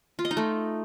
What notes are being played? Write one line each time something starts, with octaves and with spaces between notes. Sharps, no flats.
F4
D#5
D#4
A3